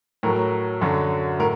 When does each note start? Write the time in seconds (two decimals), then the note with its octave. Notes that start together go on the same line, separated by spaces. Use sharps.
0.23 A2 F#3 A#4
0.81 F#2 D3 F#3
1.39 A2 A#4